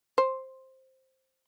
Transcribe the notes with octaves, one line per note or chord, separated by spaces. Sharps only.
C5